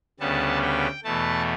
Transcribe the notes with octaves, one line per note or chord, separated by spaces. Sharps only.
D2 C#3 G3 B3 A5
G5
E2 B2 A3 A5